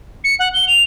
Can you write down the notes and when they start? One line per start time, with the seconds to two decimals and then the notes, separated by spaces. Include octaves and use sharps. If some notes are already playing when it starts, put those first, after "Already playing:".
0.24 C#7
0.39 F#5
0.54 G7
0.68 F7